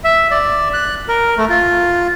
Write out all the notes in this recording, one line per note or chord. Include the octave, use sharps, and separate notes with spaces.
E5
D5
F#6
A#4
A3
F4